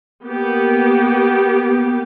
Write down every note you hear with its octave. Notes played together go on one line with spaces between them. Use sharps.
A#3 B3 G4